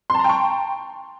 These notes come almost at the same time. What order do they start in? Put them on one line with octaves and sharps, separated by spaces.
C6 A5 A#5 G5 C#6